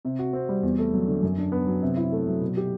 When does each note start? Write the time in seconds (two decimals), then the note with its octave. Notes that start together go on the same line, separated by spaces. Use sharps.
0.05 C3
0.19 F#4
0.33 C4
0.49 G3
0.63 E2
0.79 A3
0.94 F#3
1.08 D3
1.23 F#2
1.38 D4
1.52 B3
1.67 F#3
1.82 C3
1.97 E4
2.12 A3
2.27 F#3
2.41 B2
2.57 G4